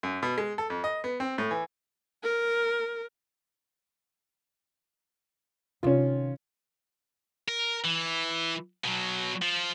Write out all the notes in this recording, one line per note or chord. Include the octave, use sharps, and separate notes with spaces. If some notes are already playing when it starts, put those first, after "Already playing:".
F#2
B2
G#3
A4
F2
D#5
B3
C4
A2
E3
A#4
C3 D#3 C#4 F4
A#4
E3
B2 F#3
F3